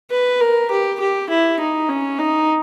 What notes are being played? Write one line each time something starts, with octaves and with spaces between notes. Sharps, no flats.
B4
A#4
G4
G4
E4
D#4
C#4
D#4